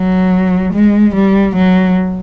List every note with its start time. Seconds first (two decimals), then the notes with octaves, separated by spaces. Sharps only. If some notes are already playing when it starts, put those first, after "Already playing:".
Already playing: F#3
0.73 G#3
1.15 G3
1.56 F#3